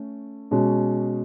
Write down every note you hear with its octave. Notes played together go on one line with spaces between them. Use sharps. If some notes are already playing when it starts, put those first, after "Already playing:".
Already playing: A3 C#4
B2 G#3 C#4 F#4